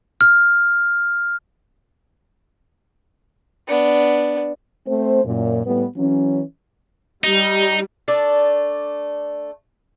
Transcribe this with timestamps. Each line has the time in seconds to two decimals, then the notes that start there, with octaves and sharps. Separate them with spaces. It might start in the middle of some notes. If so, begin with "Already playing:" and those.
0.21 F6
3.68 B3 D4
4.87 A3 C4 C5
5.25 F#2 A#2
5.66 A2 G3 B3
5.96 E3 F#3 C#4
7.24 G3 D#4
8.08 A3 D4 D5